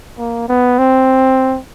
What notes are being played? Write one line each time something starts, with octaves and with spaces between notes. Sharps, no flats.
A#3
B3
C4